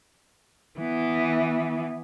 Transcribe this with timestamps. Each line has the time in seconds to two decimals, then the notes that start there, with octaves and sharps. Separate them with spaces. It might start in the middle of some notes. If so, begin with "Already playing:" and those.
0.79 E3 B3